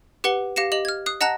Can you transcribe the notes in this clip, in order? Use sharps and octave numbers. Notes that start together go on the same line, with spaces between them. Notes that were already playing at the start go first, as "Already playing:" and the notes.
G4 B4 F#5 G7
G4 F5 A#6 C#7 E7
G4 D#5 F#7
F6 G#6
D#6 F#6 C7
D#5 F#5 A5 A#5 F#6 A#6